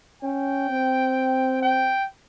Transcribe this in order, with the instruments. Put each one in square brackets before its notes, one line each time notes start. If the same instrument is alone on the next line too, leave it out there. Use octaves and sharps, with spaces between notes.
[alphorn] C#4 [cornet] G5
[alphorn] C4
[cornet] G5